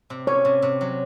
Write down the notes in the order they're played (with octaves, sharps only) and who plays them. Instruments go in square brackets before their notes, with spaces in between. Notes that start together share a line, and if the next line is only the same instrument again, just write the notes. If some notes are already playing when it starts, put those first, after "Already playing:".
[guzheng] C3
[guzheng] C#4 [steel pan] C#5
[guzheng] C3
C3
F#3